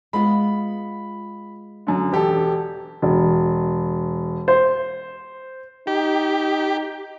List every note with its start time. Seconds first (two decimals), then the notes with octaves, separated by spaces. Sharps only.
0.13 G#3 B3 F4 B5
1.87 F#2 D3
2.12 E1 G4 A4
3.02 E1
4.48 C5
5.87 D#4 G4